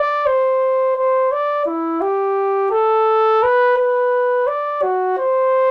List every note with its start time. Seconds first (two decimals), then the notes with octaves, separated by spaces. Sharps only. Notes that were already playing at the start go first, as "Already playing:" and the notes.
Already playing: D5
0.26 C5
0.97 C5
1.32 D5
1.66 E4
2.01 G4
2.71 A4
3.43 B4
3.77 B4
4.47 D5
4.83 F#4
5.18 C5